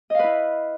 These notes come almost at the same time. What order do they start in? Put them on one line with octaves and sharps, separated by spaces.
D#5 F5 B4 E4